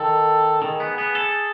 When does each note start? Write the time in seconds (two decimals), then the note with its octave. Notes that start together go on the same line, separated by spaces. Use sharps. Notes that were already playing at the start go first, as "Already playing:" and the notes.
Already playing: D#3 A4
0.62 D#3 G#4
0.80 B3
0.98 B3
1.15 A4